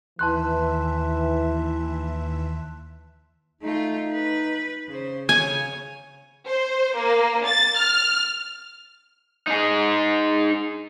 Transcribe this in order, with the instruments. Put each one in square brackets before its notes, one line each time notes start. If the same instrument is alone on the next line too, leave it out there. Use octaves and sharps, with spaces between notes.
[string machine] D#2 E5 [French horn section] E3 [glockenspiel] A5 C6 F#6
[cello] A3 F4 [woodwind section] D#4
[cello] B4
C#3 C5
[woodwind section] C#3 [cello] C#5 [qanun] G#5
[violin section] C5
A#3
A6
F6
[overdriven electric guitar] D#4 G#4